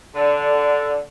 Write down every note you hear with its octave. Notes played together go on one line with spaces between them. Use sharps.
D3